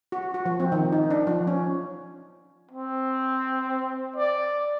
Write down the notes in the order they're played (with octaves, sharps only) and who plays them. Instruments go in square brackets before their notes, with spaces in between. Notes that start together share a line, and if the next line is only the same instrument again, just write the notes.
[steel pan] F#4
F#4
F3
C4
D#3
D#4
D4
F3
C#4
[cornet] C4
D5